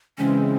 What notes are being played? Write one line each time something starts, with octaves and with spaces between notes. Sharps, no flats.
C#3 E3 G#3 C4 C#4